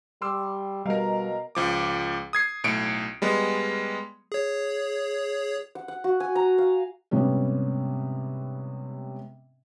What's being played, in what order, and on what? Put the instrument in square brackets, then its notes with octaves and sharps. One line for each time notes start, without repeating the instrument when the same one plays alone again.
[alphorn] G3 [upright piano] C6 D6 E6
[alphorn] B2 [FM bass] G3 [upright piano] A#4 F5 [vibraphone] D#5 A#5
[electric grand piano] C#2 F3 D6
D#6 G#6 C7
B1 A2 C#7 D7
G3 G#3 B3
[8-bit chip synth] G#4 C#5
[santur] F#5
F#5
F#4
G#5
A#5
F5
[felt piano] G#2 C3 G3 B3 C#4